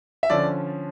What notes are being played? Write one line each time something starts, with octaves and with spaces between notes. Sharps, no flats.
E5
D3 F3 C#4 D5